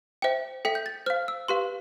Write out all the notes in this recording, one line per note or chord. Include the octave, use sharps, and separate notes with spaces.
C5 E5 G5
A4 E5 G5 B6
G6
A6
C5 F5 F6
E6
G4 B4 F5 C6